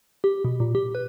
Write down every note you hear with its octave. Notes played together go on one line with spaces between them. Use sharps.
G4
B2
A#2
G4
B4